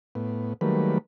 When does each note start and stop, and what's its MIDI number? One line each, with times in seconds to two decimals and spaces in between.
0.15 0.53 45
0.15 0.53 59
0.61 0.98 51
0.61 0.98 54
0.61 0.98 55
0.61 0.98 57
0.61 0.98 58
0.61 0.98 71